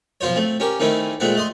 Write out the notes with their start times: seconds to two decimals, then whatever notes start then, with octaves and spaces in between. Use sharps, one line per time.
0.21 B1 F3 F4 C5 C#5
0.36 A3 C4
0.60 C#4 G4 A#4
0.80 D#3 A3 C4 C#4 E4
1.20 A#2 G#3 A3 C4 F#5
1.35 A3 D#5 C6